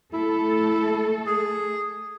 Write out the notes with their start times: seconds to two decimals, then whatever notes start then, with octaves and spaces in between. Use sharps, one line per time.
0.13 A3 E4 A4
1.27 G#4